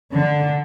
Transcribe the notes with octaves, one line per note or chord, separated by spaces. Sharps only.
D3